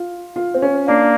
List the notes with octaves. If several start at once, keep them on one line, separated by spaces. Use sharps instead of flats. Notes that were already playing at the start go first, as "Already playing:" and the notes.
Already playing: F4
F4
C4
C#4
A#3 D4